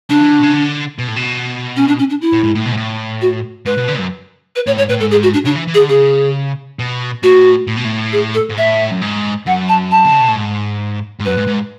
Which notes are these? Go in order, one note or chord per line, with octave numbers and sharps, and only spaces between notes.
C#3 D4
E3
D3
B2
C#3
D3
B2
A2
B2
C#4
D4
C#4
D4
E4
A2
G#2
A2
B2
G#2
A2
F#4
G#2 B4
B2
D3
F#2
B4
A2 C#5
G#2 C#5
A2 B4
G#2 A4
G#4
F#4
D4
C#3 D4
E3
E3
G#4
D3
C#3 G#4
B2
A2 F#4
A2
B2
A2
G#4
A4
G#2
A2 E5
F#2
G#2
F#2 F#5
A5
A5
D3
C#3
B2
A2
G#2
G#2
F#2 B4
G#2
G#2